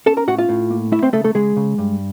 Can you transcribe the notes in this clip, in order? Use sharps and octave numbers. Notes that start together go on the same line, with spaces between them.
C#4 A4 A5
A#4 A#5
A2 F#4 F#5
F4 F5
A2
A#3
A3 E4 E5
C4 C5
C#3 A3 A4
A3 A4
C#3 G#3 G#4
C#3
G2